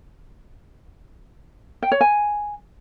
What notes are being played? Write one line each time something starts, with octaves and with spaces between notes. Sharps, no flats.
G5
C#5
G#5